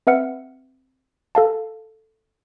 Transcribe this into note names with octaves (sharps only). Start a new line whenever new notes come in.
C4 B4 E5 F#5 F6 C#7
A4 F5 A5